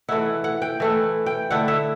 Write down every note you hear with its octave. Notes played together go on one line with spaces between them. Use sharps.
E3 A3 E4 F#5
F#5
G5
E3 A3 E4
G5
D3 A3 E4 F#5
E5